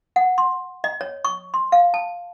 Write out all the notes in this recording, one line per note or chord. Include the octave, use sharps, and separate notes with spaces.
F#5
C6
D#5
C#5
C#6
C6
F5
A5